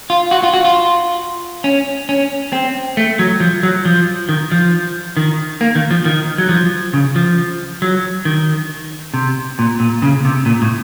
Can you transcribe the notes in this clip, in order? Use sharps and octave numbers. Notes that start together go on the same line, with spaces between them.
F4
F#4
F4
F#4
F4
C#4
C#4
C4
A3
F#3
F3
F#3
F3
D#3
F3
D#3
A#3
D#3
F3
D#3
F#3
F3
C#3
F3
F#3
D#3
C3
A#2
A#2
C#3
C3
A#2
A2